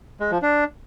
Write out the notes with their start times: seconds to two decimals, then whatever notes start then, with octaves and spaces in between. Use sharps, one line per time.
0.20 G#3
0.31 F3
0.42 D4